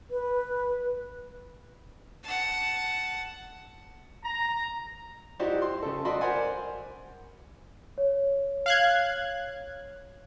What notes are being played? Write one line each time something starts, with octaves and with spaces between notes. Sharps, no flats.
B4
F#5 A5
A#5
D#4 E4 F#4 G4 C5 D5
C6
C#3 A4
F#4 D5 D#5 B5 C6
A#4 C5 D5 F#5 G#5
C#5
F5 F#6 G#6